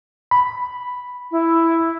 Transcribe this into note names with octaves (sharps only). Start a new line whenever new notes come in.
B5
E4